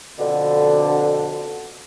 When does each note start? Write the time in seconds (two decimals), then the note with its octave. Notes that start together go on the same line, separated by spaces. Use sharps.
0.19 F2 B2 D3